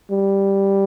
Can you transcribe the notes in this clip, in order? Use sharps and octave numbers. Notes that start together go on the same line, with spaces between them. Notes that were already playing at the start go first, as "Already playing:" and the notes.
G3